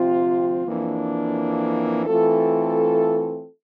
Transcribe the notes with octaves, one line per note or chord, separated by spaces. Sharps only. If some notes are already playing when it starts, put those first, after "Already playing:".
Already playing: D2 C3 F3 C4 F4
F2 E3 A#3 D4
E3 A3 C4 F4 A4